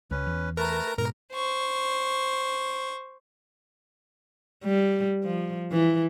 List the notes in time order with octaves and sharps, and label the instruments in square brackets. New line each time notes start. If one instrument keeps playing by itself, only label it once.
[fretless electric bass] C#2 [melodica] C#4 B4
[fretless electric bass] E2
[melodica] A3 B4 A5 [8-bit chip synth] A#4 A#5
[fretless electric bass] G#2 B2 [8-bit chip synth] A#4 [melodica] A#5
[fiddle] C5 C#6
[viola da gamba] G3
F3
E3